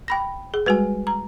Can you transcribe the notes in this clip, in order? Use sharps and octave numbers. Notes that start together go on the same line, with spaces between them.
G5 B5 A#6
G#4
G3 G#3 F#4 B4 G#5
A#5